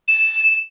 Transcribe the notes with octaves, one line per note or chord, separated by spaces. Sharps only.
E7